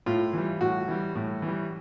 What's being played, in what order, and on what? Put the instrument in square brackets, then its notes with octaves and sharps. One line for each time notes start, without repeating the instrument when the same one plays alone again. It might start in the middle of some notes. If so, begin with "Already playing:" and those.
[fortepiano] A2 F4
E3 G3
A2 F#4
E3 G3
A2
E3 G3